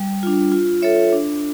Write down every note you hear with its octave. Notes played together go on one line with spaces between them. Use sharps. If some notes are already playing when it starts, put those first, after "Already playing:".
Already playing: G3
D4 F4
F4
A4 C#5 E5
D4